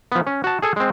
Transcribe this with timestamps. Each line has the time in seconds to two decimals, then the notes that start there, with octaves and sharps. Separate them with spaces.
0.12 F3 B3
0.27 C#4
0.44 F#4 A5
0.62 G#4 A4 G#5
0.76 G#3 C4